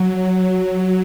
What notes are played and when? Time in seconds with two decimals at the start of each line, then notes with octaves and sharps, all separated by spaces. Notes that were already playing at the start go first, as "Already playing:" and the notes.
Already playing: F#3